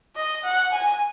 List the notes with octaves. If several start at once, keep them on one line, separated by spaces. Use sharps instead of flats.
D#5
F#5
G#5